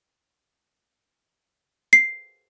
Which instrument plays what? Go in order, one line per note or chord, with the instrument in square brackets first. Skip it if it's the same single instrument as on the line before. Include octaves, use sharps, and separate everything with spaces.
[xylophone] C7